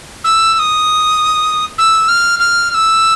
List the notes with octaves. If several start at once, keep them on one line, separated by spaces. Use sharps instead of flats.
E6
E6
D#6
E6
F6
F6
F6
E6